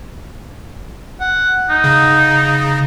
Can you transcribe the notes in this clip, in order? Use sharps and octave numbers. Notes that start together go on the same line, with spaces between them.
F#5
D#4
C#3